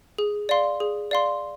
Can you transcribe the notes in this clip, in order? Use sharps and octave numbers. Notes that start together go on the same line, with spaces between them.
G#4
D5 F5 C6
G#4
D5 F5 C6